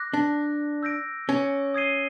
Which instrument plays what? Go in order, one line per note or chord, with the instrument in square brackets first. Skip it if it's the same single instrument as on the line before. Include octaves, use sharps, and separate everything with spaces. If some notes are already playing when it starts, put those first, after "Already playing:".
Already playing: [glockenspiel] D6 F#6 A#6
[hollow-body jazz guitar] D4
[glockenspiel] E6 G6 A#6 D7
[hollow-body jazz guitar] C#4
[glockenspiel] D#6 G#6 C7 D#7 G7